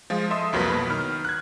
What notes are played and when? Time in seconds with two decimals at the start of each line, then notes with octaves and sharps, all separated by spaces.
0.10 F3 G#3 F4
0.30 A4 D#5 E5 C6 D#6
0.53 C2 F2 F#3 A#3 B4 B6
0.70 B2 B4 B5
0.90 D#3 F6
1.25 F#6 G#6